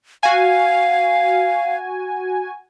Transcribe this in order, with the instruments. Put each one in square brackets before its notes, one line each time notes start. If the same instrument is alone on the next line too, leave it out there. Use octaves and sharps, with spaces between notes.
[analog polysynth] F#4 G#5 [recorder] F5